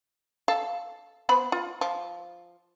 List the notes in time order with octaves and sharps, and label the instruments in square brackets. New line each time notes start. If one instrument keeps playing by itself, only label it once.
[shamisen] A4 F5
B3 C5 B5
F4
F3